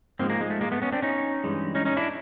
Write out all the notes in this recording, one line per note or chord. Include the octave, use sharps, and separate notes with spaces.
G#2 F3 G#3 A#3 C4
G#3 A#3
G#3
A3
G#3 A#3
A3 B3
B3 C#4
C4 D4
C#4 D#4
G2 E3 G#3
C#4 D#4
C#4 D#4
D4 E4